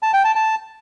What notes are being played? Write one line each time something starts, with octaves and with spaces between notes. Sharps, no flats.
A5
G5
A5
A5